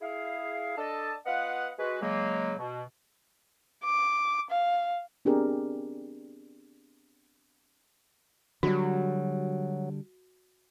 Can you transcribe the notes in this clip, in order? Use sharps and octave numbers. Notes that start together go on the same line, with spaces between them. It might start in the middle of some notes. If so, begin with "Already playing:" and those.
E4 G#4 F5
D4 A4 D#5 A5
B3 F4 B4 D#5 F5 F#5
G#3 F#4 B4
C#3 F#3 G#3 A#3
B2
D6
F5
B3 C4 D4 G4 G#4 A#4
D3 F#3 G3 F#4